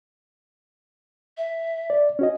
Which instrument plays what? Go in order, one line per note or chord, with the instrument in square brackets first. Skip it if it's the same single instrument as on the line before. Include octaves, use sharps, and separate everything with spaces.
[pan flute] E5
[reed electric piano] D5
C#4 F#4 D#5